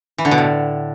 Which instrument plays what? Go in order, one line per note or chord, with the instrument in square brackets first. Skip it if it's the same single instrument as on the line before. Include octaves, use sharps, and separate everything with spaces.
[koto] E3
D3
B2
A2